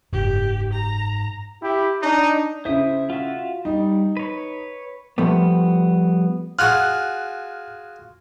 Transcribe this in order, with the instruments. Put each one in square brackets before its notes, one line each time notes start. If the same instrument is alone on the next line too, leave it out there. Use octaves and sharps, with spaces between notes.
[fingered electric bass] F#1 [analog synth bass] G#2 [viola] G4
[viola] A#5
[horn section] E4 G4
D4 D#4
[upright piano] C#3 E4 [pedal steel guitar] C5 E5 D#6
[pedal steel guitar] F4 F#4 E5
[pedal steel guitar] G3 [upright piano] D#4
[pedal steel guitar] B4 C#5
[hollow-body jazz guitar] F3 G3 A3 B3
[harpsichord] F4 F#4 G#4 [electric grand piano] F6 F#6